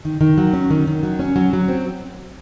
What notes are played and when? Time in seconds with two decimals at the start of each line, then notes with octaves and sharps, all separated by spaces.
0.05 D#3
0.21 D#3
0.38 F#3
0.53 C#4
0.70 D#3
0.87 D#3
1.03 F#3
1.19 C#4
1.36 F#3
1.53 F#3
1.69 C4